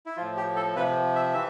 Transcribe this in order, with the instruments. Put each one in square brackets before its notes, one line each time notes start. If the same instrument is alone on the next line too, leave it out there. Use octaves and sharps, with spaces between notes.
[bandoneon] E4
A2 F3 F4
G4
A4
C3 F3 B4
E5
E3 E5